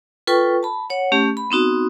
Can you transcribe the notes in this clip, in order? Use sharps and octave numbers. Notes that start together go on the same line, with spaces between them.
F4 A4 B4 G5 C#6
A5 B5
C#5 F#5
A3 C#4 G4
B5
B3 C4 D#4 F#4